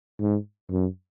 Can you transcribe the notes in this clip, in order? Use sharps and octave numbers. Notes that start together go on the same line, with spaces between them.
G#2
F#2